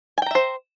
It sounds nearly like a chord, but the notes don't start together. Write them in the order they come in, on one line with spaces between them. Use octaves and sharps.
G#5 G5 A#5 E5 C5